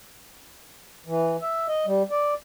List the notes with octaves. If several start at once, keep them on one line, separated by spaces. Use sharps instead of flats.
E3
E5
D#5
G3
D5